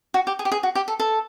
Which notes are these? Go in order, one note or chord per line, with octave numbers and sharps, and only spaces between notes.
F#4
G4
G#4
G4
G#4
F#4
G4
A4
A4